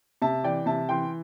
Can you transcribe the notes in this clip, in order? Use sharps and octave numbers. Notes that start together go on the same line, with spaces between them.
C3 E5 A5
E3 D5 G5
C3 E5 A5
E3 G5 C6